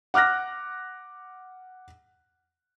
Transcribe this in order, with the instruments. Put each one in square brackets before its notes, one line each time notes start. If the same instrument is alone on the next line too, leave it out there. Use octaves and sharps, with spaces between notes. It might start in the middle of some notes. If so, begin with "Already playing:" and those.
[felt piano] F#5 D6 F6 F#6 A#6